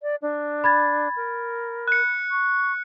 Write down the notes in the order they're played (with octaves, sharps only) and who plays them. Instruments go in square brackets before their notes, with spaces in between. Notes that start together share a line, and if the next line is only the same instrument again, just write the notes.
[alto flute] D5
D4
[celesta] B5 G#6 A6
[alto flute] A#4
[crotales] F#6 C#7
[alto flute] C#6